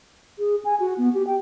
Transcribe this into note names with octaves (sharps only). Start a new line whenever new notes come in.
G#4
G#5
F#4
B3
G4
G5